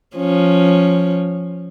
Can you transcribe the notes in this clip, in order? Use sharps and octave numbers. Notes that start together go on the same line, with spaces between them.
F3 C#4